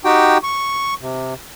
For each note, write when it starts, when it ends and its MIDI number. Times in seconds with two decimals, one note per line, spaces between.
0.05 0.38 63
0.05 0.38 66
0.05 0.38 67
0.05 0.38 79
0.43 0.94 85
1.01 1.34 48